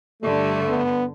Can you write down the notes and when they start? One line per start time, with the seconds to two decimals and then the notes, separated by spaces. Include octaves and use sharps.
0.23 G2 D3 G3 A3
0.68 B3